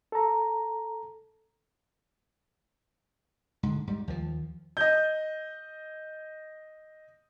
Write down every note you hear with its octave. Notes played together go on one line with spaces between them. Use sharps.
A4 A#5
G#2 D3
G#2 G3
D#2 F3
D#5 G6